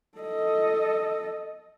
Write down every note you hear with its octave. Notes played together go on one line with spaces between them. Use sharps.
A4 D#5